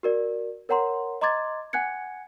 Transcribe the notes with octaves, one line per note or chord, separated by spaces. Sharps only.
F#4 A#4 D5
A#4 C#5 F#5 A#5 C6
D#5 A#5 C6 D6 G#6 A6
F#5 G#5 F#6 G#6 C#7